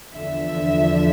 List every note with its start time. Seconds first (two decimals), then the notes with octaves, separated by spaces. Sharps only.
0.15 E2 D3 F3 E5